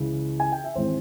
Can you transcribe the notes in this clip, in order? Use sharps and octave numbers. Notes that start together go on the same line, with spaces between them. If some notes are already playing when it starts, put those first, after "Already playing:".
Already playing: C#2 C#3 E3
G#5
G5
E5
G#1 E3 G#3 C4 C5